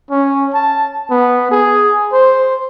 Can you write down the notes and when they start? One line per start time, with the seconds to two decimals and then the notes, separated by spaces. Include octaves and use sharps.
0.10 C#4
0.54 A5
1.10 B3
1.51 G#4
2.13 C5